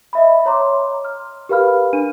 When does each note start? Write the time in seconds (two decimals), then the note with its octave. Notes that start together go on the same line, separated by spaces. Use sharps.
0.13 D#5 E5 B5
0.46 C#5 A#5 C6 D6
1.05 F6
1.49 G4 A#4 B4 F5 B5 F6
1.93 D4 D#7